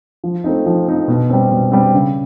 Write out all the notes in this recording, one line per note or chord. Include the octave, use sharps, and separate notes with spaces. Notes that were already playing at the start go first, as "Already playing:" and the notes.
F3
A3 C4 D#4
F3
A3 C4 D#4
B2
G3 C4
B2
G3 C4
C#3